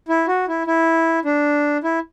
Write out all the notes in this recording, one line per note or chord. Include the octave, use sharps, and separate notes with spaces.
E4
F#4
E4
E4
D4
E4